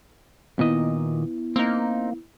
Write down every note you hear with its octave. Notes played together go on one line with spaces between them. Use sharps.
A#2 D#3 B3 E4 D#5
A#3 C4 D#4